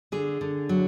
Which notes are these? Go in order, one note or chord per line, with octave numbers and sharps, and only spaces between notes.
D3 G#4
D3
F#3